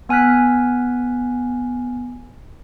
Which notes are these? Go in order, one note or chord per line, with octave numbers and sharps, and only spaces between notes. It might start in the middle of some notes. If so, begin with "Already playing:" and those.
B3 G#5 F6 F#6 B6